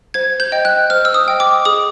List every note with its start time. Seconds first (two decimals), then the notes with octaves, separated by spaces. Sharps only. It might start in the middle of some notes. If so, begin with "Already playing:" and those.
0.14 C5 G#6
0.40 G6
0.52 D#5 G5
0.65 F#6
0.90 C5 F6
1.05 E6
1.14 D#6
1.28 D#5 G5
1.40 D6
1.65 G#4 D#6